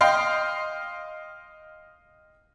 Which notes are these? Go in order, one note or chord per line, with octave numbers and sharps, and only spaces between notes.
D#5 F5 G5 C6